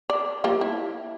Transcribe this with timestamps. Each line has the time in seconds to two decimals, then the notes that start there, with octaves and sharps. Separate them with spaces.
0.10 D5
0.44 F3 G3 A#3
0.61 E4